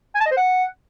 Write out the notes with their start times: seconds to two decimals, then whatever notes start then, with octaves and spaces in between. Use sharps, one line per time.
0.15 G#5
0.20 A5
0.26 D#5
0.31 C5
0.37 F#5